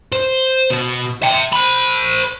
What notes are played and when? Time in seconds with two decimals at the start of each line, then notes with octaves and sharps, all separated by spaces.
0.13 C5
0.71 B2
1.22 E5 G5
1.52 C5 B5